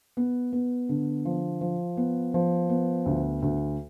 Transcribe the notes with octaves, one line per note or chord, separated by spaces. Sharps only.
B3
B3
D3
F3
F3
B3
F3
B3
D2
D2